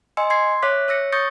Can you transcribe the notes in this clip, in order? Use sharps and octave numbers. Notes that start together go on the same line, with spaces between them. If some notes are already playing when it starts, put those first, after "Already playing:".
D#5 G#5 C6 E6 C#7
C6 G#6 C7
C#5 E5 D6 F#6 B6
C#5 E6 A#6 C#7
C#6 D#6 G6 A6 A#6 C#7